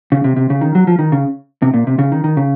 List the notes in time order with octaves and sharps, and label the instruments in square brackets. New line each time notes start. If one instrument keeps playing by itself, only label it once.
[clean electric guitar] C#3
C3
C3
C#3
D#3
F#3
F3
D#3
C#3
C3
A#2
C3
C#3
D#3
D#3
C#3